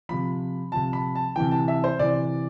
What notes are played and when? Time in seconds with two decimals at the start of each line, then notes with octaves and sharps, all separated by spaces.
0.09 C3 F3 B5
0.72 C3 F3 A5
0.93 B5
1.15 A5
1.36 C3 E3 G5
1.51 A5
1.68 E5
1.84 C5
1.99 C3 E3 D5